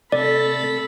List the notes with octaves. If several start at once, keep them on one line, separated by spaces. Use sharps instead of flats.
C3 A3 A4 D5 B5 A6